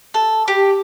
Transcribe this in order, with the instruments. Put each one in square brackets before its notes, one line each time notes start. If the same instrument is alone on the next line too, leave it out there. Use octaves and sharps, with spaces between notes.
[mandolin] A4
G4